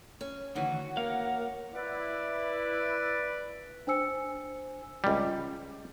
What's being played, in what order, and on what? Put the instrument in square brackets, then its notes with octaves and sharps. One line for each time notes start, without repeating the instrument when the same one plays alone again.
[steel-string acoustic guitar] C#4
[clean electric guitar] D2 D#3 E3 [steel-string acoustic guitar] C#4 F#4 [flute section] F#5
[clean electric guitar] A#3 F5 [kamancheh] A#4
[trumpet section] E4 [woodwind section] B4 D5
[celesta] D4 C5 G#5 E6 C#7
[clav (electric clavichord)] C#2 G3